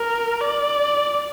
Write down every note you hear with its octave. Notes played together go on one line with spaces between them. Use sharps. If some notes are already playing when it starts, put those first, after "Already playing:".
Already playing: A#4
D5